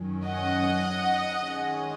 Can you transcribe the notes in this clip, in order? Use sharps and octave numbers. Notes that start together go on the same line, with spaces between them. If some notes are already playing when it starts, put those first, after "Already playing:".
Already playing: F#2 D#3 F#3 C#4
D#5 F#5
D#3 G#3 C#4